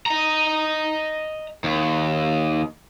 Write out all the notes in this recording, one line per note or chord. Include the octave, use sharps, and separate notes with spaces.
D#5 A#5
D#2